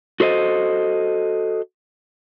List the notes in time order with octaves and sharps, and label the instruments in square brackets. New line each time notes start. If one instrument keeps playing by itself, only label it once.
[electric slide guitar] F#4 A4 C5 D#5